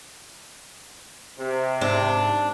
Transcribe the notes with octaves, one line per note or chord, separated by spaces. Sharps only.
C3
G#2 C4 D4 E5